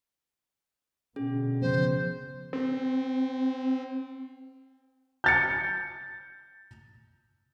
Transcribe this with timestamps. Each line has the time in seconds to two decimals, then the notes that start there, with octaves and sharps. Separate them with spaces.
1.16 B2 D3 C#4 G#4
1.62 C#3 F3 B3 C5
2.53 C4
5.24 G6 A6 C#7